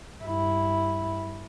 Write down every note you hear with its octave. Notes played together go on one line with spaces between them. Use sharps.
G2 E4